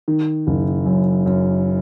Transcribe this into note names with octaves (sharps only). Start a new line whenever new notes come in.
D#3
F#1
F#2
F#2